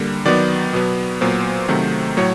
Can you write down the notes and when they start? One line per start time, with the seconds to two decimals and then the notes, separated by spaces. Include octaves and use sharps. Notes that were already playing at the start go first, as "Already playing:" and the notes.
Already playing: D3 G3 A#3
0.26 D#3 F#3 B3 D5
0.73 B2 F#3 B3
1.21 A#2 F#3 B3 C5
1.68 C3 D#3 F#3 A3
2.17 A2 F#3 A3 C#5